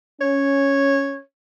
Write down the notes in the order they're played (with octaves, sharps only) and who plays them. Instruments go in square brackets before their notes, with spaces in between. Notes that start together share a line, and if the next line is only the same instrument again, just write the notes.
[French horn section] C#4 [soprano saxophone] C#5